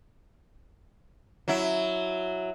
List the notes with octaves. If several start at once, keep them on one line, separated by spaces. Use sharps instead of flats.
F#3 E4